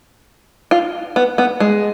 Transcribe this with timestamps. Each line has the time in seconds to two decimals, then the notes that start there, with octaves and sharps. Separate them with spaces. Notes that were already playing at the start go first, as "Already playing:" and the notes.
0.71 F4
1.16 B3
1.38 B3
1.60 G#3